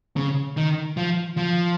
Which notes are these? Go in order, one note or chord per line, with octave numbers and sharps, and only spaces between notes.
C#3
D#3
F3
F3